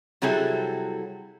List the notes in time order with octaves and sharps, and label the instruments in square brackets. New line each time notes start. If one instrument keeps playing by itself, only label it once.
[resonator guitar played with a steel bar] C3 F#3 G3 E4 G#4 A4